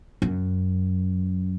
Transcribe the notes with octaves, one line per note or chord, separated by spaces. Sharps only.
F#2